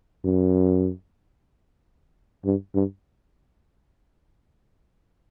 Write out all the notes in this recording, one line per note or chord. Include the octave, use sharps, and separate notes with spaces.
F#2
G2
G2